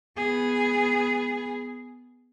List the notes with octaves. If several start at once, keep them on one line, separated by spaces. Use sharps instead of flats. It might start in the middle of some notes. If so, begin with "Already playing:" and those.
B3 G#4